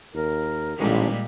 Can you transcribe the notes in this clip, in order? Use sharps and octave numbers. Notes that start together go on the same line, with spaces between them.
D#2 A#4
A1 A#2 D#3 G3 G#3